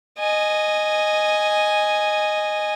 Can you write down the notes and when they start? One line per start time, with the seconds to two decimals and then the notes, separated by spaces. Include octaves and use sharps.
0.19 D#5 G#5